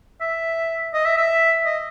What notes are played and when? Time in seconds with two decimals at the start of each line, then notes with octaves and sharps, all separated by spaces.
0.21 E5
0.93 D#5
1.05 E5
1.17 E5
1.65 D#5